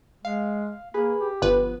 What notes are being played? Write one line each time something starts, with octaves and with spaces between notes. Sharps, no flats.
G#3 F5
A#3 G#4 B4 B5
G4
G1 F3 B3 B4